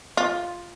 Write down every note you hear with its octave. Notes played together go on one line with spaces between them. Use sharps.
F4